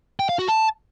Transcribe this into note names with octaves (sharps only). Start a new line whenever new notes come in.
G5
F5
F#4
A5